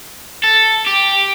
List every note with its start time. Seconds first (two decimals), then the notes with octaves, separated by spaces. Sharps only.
0.44 A4
0.87 G4